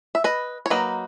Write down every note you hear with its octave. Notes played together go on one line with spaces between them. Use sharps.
E5
B4 D#5
C#5
F#3 A#3 D#4 B4 D#5